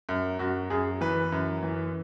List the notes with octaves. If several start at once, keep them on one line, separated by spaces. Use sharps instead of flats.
F#2
F#2 F#4
F#2 G#4
E3 B4
F#2
E3